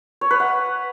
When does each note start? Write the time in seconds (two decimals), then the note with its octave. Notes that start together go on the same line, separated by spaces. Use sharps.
0.21 C#5
0.31 B4
0.40 F#5